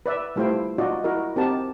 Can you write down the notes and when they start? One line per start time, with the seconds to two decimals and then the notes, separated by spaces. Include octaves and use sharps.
0.06 B4 D5 E5
0.36 G3 A3 E4 F4 C5 G5
0.78 D#4 F4 F#4 D5 D#5
1.04 E4 F#4 A#4 D#5
1.36 C4 D#4 G4 A#4 F#5 A5